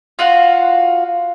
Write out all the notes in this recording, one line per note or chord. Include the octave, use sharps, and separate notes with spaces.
F4 F#4 F5